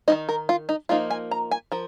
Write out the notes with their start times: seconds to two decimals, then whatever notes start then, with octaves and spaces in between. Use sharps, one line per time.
0.08 D#3 A#3 D#4 D#5
0.29 A#4
0.49 F4
0.69 D#4
0.89 F3 A#3 D#4 F4
1.10 G#5
1.31 A#5
1.51 G#5
1.72 F3 A#4